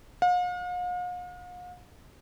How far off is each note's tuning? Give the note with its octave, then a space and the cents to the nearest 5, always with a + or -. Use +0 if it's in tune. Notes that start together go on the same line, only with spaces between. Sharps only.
F5 +45